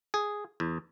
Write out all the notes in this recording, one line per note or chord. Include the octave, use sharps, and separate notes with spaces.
G#4
E2